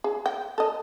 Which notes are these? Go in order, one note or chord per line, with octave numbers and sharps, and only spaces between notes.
G#4
G5
A4 D#5